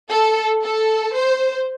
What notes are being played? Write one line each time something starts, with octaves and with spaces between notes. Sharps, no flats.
A4
A4
C5